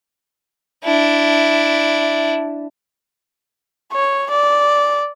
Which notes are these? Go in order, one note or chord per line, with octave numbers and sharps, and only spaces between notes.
D4 E4
C#5
D5